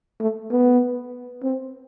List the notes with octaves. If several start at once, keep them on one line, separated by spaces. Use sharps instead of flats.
A3
B3
C4